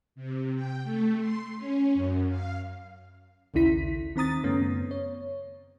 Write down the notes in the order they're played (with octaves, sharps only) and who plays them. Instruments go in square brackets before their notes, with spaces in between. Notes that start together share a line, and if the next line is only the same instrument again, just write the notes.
[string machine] C3
G5
A3
C6
C#4
F#2
F5
[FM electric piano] A#1 D#2 C#3 E4 B6
D#3 C4 A#5 D#6 A6
F#2 C#3 A3 B3 C#4
C#5